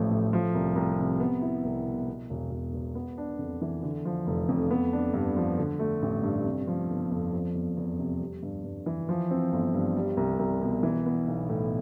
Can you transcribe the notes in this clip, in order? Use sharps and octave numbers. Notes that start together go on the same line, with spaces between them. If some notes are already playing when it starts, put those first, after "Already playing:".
Already playing: A1 F3 A3
A2
F3
C2
C2
C3
B3
E4
C2
B2
B2
E1
E1
E2
B3
D4
F2
E3
D3
F3
F1
F2
B3
D4
G2
F3
D3
A3
A1
G2
C3
F3
G1
F2
F3
E2
E2
C3
G3
G2
G2
E3
F3
C4
G1
G2
G3
C2
C2
B2
E3
B3
B1
A2